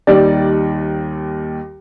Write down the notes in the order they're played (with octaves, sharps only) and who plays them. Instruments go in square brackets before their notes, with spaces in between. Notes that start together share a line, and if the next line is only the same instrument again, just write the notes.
[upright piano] D#2 D#3 G3 D5